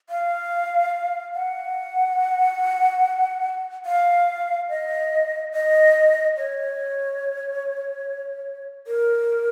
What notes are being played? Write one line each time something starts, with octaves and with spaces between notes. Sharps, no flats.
F5
F#5
F5
D#5
D#5
C#5
A#4